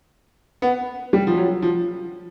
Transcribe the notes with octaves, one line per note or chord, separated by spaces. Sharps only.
B3
G3
F3
F#3
F3